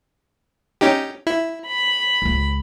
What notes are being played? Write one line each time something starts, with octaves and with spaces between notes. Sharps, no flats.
C#4 D#4 G4
E4
B5
C#2 F4